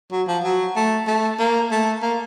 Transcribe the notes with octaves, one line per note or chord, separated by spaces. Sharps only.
F#3
F3
F#3
A3
A3
A#3
A3
A#3